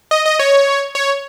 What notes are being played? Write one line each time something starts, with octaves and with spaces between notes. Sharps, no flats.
D#5
D#5
C#5
C#5